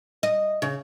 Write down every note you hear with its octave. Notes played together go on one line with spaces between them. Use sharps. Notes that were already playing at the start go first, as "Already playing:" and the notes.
D#5
C#3